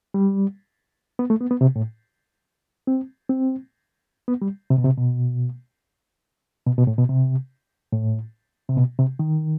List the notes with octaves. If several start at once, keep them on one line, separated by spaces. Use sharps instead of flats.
G3
B3
A3
B3
B3
C3
A2
C4
C4
B3
G3
C3
B2
C3
B2
B2
B2
A2
B2
C3
A2
C3
B2
C3
D#3